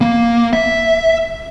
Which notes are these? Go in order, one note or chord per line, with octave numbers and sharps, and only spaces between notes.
A#3
E5